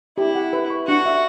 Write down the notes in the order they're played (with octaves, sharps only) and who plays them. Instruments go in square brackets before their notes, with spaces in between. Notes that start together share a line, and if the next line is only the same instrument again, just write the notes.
[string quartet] E4 [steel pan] G4
[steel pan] F#5
B4
C#6
[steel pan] D4 [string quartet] F#4
[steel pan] E5